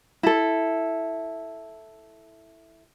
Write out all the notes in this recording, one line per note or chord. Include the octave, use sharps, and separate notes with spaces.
E4 A4